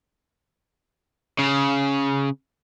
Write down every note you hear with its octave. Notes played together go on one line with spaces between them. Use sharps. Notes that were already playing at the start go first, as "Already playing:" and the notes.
C#3